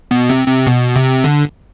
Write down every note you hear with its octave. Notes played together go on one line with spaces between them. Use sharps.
B2
C3
C3
B2
C3
D3